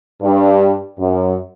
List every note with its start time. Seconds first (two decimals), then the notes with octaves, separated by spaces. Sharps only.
0.22 G2
0.99 F#2